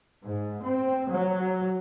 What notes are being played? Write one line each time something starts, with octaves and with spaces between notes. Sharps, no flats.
G#2
C4
F#3